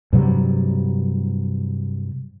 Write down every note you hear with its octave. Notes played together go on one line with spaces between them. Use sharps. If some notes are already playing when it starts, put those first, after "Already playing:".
G2 C3 F#3 G3